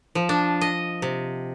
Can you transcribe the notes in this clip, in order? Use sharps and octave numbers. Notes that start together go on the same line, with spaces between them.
F3
D4
D#5
C3